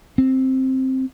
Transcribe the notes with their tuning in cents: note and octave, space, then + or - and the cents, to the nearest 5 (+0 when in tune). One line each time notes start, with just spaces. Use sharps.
C4 +5